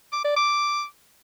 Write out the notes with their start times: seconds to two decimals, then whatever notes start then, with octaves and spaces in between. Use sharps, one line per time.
0.13 D6
0.25 D5
0.37 D6